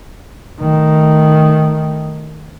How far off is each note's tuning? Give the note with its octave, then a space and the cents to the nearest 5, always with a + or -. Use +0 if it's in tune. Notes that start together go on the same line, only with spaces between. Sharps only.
D#3 +0 A3 +0